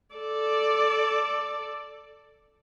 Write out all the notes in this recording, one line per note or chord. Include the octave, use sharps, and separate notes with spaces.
A4 D5